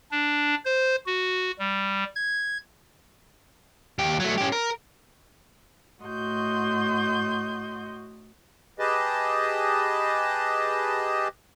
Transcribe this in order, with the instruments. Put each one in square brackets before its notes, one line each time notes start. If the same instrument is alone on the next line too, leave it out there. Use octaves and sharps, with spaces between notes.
[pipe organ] D4
C5
F#4
G3
G#6
[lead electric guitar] D#2 G4
F#3 A3
C#4 G4
A#4
[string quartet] A2 F#4 D#5 C6 G6
[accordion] G4 G#4 B4 D#5 A5